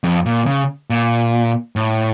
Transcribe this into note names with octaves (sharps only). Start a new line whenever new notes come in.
F2
A#2
C#3
A#2
A2